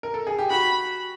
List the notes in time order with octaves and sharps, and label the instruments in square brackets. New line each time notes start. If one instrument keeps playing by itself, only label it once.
[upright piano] A#4
A4
G#4
G4
[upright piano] F#4 [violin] B5